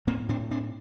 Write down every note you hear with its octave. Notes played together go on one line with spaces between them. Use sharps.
A2 A#3 C4
A2 C4 D4
A2 C4 D4